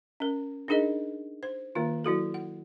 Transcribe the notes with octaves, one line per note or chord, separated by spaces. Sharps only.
C#4 A#4
D4 D#4 G#4 A#4 D#5
C5
D#3 A#3 F4
F#3 E4 F#4 A4
F#5